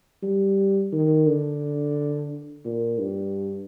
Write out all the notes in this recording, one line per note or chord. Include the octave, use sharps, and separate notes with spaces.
G3
D#3
D3
A#2
G2